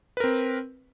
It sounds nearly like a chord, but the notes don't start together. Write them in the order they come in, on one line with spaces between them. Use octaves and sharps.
B4 A#4 C4